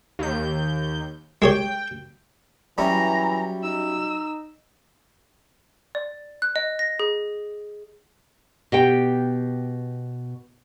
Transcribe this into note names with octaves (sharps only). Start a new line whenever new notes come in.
D#2 G6
G#3 G4 C#5 G5
E3 F#3 G3 C#4 E4 A#5
D#4 E6
D5
F#6
D#5
A#6
G#4
B2 G4 G5